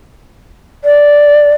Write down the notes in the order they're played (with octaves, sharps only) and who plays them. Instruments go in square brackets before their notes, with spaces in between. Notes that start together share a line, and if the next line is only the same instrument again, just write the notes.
[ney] D5